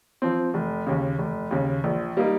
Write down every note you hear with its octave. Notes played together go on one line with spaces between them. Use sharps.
F3 C4
F1
D#2 C#3
F1
D#2 C#3
A#1
G3 A#3 D#4